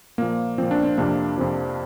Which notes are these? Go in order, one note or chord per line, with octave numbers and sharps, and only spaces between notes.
A#2 F3 A#3
A#2 F3 C4
D4
C4
F2 C3 F3 A#3 D4
F2 C3 F3